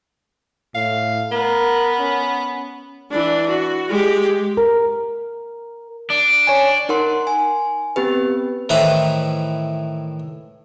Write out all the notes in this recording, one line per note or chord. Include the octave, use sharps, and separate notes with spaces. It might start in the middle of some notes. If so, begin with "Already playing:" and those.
A2 F5
B3 A#4
C#4
E3 D4
F#4
G#3 G4
A#4
D4
C#5 G#5
D#4 A#4 F#5 C6
G#5
B3 C4 G4 B4
A2 D#3 E3 B4 C5 A#5